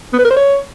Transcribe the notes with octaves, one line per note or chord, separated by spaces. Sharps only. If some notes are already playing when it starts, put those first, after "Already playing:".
B3
B4
A#4
C5
C#5